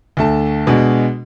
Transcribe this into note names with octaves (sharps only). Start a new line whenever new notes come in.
D2 A3 A5
B2 G#3 D4 F#4